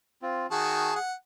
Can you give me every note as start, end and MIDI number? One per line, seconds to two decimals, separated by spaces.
0.22 0.47 60
0.22 0.47 65
0.51 0.92 51
0.51 0.92 66
0.51 0.99 68
0.51 0.92 81
0.96 1.13 78